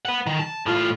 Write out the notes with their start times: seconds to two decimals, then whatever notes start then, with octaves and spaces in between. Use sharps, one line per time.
0.05 B4 F#5
0.27 D#3
0.39 A5
0.66 A2 F4